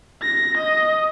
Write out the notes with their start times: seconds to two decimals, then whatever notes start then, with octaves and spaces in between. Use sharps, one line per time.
0.22 A#6
0.58 D#5